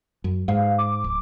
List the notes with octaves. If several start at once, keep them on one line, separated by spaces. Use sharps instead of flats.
F#2
G#2 F5
D6
D1